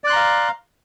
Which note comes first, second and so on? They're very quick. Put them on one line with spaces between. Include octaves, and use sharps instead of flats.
D5 F#6 C6 A#5 F5